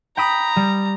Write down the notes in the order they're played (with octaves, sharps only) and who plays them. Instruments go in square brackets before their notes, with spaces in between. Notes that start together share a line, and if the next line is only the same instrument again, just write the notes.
[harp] G5 B5 D#6 [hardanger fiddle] A#5
[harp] G3